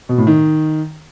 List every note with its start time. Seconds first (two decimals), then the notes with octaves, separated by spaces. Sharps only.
0.09 B2
0.18 A2
0.27 D#3